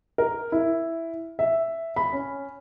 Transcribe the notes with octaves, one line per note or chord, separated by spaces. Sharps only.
A#4
E4
E5
B5
C#4